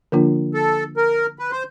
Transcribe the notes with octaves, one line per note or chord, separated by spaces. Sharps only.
D3 F3 A#3 D4 F4
A4
A#4
B4
C5